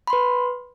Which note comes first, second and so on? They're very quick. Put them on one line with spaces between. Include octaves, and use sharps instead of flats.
B5 C6 B4